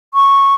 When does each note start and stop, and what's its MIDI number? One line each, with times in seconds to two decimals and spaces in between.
0.14 0.55 85